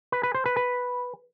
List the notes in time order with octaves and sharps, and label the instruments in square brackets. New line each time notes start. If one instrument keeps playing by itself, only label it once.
[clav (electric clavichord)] B4
B4
C5
B4
B4